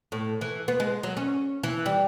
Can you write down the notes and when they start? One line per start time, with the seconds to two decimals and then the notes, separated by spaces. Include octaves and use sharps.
0.12 A2
0.41 E3
0.68 B3
0.80 G#3
1.03 F#3
1.17 C#4
1.63 E3
1.86 G3